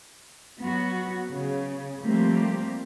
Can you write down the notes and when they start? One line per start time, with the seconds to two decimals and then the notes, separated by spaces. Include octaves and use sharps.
0.59 F#3 B3 F#4
1.29 C#3
2.03 F3 G3 A3 A#3 C4 G4